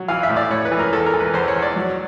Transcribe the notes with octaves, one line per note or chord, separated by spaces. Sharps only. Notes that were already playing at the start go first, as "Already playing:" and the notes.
Already playing: F#3
E3 F5
E5
A2
D5
A2 C#5
B4
E3
A#4
E2 A4
A#4
E3
B4
E2 C5
C#5
E2
D5
F#3